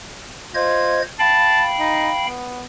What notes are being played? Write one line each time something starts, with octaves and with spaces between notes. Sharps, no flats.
F4 C5 D#5 G#6
F5 G5 A5 B5
D#4
B3